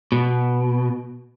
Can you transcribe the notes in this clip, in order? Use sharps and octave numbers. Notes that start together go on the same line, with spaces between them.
B2